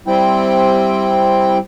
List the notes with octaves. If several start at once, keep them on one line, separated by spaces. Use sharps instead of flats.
G3 C4 E4 G5